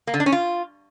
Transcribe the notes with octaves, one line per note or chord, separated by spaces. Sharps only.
A#3
D3
D4
C#4
F4